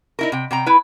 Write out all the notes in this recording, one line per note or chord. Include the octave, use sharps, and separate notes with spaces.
D#4 E4 A#4
C3 G5
C3 G5 A#5
E4 B4